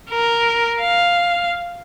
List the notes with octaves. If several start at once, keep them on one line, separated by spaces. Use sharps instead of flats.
A#4
F5